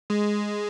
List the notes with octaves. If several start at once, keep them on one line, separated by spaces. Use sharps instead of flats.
G#3